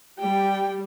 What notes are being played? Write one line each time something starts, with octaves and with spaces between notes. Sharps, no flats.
G3 G5